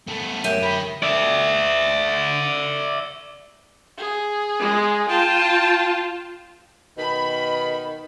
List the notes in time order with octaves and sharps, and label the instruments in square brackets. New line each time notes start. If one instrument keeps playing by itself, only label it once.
[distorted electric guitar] A3 B3
[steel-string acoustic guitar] F#2 G4 E5 [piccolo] D#7
[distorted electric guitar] A#4 G5 [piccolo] B5
[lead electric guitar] D5 E5
[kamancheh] G#4
[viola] G#3
[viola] F4 [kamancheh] G5 A5
[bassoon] B2 [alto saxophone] D#3 [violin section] B5